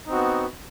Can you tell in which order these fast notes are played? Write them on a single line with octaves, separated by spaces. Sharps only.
D#4 C4 F#4 B3